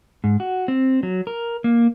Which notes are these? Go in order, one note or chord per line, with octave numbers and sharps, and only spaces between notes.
G#2
F#4
C4
F#3
A#4
A#3